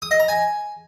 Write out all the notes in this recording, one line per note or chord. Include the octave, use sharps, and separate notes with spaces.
D#6
D#5
A#5
G#5